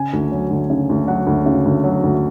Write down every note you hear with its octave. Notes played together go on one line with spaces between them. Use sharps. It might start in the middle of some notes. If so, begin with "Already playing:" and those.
Already playing: C#3 G#5
D2
F#3
D2
C#3
D2
F#3 F#5
D2
C#3
D2
F#3
D2